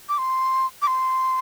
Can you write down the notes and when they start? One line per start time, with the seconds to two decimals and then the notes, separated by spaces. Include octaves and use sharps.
0.09 D6
0.18 C6
0.82 D6
0.87 C6